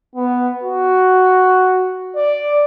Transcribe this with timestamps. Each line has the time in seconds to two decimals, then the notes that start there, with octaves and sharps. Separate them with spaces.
0.16 B3
0.63 F#4
2.16 D5